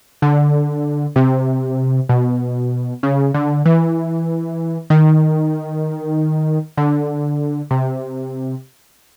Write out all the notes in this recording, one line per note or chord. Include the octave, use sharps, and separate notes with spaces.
D3
C3
B2
C#3
D3
E3
D#3
D3
C3